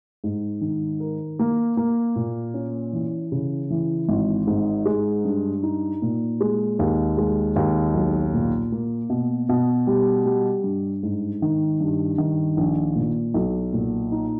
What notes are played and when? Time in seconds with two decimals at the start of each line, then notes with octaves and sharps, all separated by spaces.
0.24 G#2
0.61 D#3
1.00 A#4
1.39 A#3
1.77 A#3
2.16 A#2
2.54 C#4
2.93 E3
3.32 C#3
3.70 E3
4.08 G#1
4.47 G#2
4.85 G#3
5.25 G2
5.63 D#4
6.02 A#2
6.41 G#3
6.79 D#2
7.18 G#3
7.56 D#2
7.94 B1
8.34 A#2
8.72 A#3
9.10 B2
9.49 B2
9.87 G3
10.25 G3
10.64 G2
11.03 G#2
11.42 D#3
11.81 G2
12.18 D#3
12.57 A#1
12.95 A#2
13.34 B1
13.73 A#2
14.12 D#4